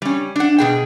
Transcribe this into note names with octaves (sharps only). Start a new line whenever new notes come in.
G3 C#4
D4 F#5
B2 G#4 G5